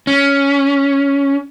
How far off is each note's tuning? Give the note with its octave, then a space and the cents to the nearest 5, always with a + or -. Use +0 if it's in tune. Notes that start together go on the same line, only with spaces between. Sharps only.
C#4 +10